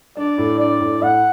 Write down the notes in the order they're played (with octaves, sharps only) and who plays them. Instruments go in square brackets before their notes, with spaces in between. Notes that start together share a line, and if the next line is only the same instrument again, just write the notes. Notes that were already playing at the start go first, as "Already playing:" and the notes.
[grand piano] D4 [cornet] D5
[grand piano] A2
[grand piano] D4 [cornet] D5
[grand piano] A2
[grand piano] A2 [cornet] F#5